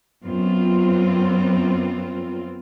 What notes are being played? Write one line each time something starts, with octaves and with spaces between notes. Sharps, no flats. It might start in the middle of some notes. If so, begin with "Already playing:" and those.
F#2 B3 C4 F4